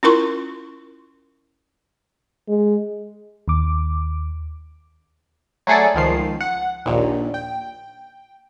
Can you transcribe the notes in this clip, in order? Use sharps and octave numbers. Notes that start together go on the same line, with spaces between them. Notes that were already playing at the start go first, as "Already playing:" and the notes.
C#4 E4 F4 A#4 C6 C#6
G#3
D#2 D6
F#3 A3 G#4 A4 D5
C#2 D#3 F3 C7
F#5
A#1 D#2 A#2
G5